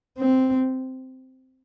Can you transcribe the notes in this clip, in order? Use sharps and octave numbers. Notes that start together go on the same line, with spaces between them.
C4